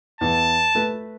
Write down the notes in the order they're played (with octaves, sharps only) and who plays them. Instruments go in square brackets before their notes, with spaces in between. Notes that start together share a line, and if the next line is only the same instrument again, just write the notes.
[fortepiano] E2 [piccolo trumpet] A5
[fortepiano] A3 B4